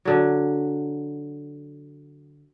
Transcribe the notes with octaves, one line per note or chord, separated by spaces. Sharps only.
D3 F#3